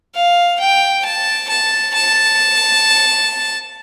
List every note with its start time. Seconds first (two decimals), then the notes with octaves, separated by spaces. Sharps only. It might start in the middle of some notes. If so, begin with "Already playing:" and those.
0.14 F5
0.59 G5
1.05 A5
1.49 A5
1.94 A5